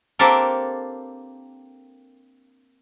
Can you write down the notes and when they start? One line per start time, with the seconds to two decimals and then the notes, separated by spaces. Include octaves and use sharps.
0.19 A#3 C4 D4 G4 A4 A#4